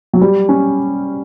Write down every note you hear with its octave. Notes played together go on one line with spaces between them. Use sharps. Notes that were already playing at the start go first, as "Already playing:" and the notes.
F#3
G3
C#4